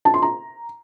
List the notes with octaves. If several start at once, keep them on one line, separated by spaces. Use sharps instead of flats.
A5
C6
A#5